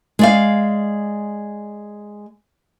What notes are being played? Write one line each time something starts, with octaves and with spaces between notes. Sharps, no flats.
G#3 D5 F5